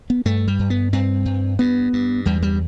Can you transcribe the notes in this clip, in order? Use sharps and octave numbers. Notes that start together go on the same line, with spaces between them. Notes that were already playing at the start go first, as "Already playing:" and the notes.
B3
G2 A3
G3
G2
B3
G2 C4
G2
G2 B3
G2
E2 G3
G3